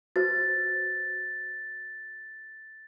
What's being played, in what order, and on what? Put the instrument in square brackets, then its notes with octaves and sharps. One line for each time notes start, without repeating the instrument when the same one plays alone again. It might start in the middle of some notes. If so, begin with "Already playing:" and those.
[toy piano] F#4 B4 C5 [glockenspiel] A6